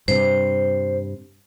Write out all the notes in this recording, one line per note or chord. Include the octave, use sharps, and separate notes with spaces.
G2 C3 C5